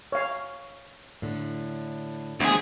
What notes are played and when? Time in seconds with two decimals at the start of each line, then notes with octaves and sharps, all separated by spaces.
0.12 C#5 F5
1.22 A2 D3
2.40 D2 C4 G#4